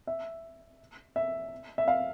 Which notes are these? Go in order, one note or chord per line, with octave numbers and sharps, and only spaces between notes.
E5
E5
E5
F5